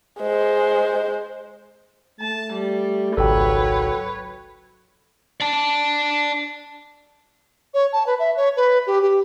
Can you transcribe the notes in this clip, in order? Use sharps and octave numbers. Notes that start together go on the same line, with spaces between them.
G#3 C5
A3 A5
G3
G#1 C#2 F#3 A4 B4 C#5 G5
D5 A5
C#5
A5
B4
E5
C#5
B4
G4
G4